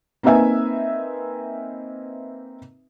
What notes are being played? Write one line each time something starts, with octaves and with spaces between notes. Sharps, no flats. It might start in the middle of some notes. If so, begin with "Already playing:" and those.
A#3 C4 D#4 B4 E5 G#5